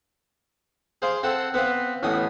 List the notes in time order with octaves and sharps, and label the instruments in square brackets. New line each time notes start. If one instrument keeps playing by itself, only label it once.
[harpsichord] G#4 C5 F5 C6 D6
C4 A4 F#5 C6
B3 C4 B4 F5
A1 A2 B3 G#5 D#6